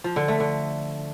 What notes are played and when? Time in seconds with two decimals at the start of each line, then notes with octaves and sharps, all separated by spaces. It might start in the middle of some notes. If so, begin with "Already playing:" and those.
0.04 F3
0.16 D3
0.28 A3
0.40 D3